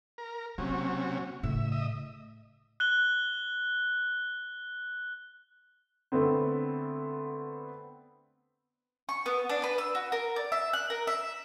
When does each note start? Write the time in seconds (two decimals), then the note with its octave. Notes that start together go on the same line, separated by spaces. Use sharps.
0.18 A#4
0.58 C3 F#3 A#3 C#4
1.43 A2 C#3 E5
1.72 D#5 E5
2.80 F#6 G7
6.12 D3 A3 B3 C4
9.09 C#6
9.26 B3
9.49 D4
9.64 B4
9.78 E6
9.95 F#4
10.12 A#4
10.36 D5
10.52 E5
10.73 F#6
10.90 A#4
11.07 E5